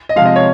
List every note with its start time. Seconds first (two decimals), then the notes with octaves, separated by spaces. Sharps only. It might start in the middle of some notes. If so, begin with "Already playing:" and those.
0.09 D#5
0.16 C3 F3 G#3 F5
0.26 D#5
0.36 C#5